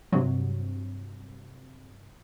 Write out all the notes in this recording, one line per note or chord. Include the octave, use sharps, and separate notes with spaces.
G2 C3 F#3